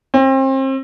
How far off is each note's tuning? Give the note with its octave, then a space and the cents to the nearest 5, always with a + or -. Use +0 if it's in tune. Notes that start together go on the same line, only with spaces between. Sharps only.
C4 +35